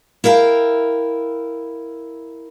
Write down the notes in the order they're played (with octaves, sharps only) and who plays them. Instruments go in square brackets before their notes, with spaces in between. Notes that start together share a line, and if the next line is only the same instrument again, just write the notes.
[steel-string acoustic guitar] E4 A#4 F5 G5